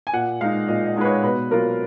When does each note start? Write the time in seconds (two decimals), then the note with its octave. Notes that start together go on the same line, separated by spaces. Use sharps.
0.07 G#5
0.13 A#2 F#5
0.41 G#3 D#4 F5
0.68 A#2 D#5
0.86 D#5
0.96 G#3 D#4 B4
1.05 C#5
1.23 B2 B4
1.51 F#3 A#3 F4 A#4